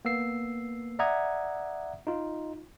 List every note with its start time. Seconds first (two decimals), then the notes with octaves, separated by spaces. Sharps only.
0.05 A#3 B3 E6 C7
0.99 D5 E5 F#5 A#5 D#6 G#6
2.07 D#4 F4